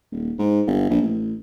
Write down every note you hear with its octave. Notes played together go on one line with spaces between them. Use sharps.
D#1
G#2
G1
A#1
A1